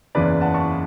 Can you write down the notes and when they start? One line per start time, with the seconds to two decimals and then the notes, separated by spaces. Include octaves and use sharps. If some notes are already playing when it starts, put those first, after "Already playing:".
0.15 F#1 E2 C#3 E3 B4 D5
0.41 F#5 A5
0.54 A5 C#6